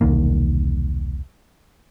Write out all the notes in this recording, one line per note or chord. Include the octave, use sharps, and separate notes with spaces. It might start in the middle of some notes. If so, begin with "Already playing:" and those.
E1 C2 D#3 A#3